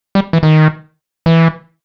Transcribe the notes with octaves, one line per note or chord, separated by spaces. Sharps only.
G3
E3
D#3
E3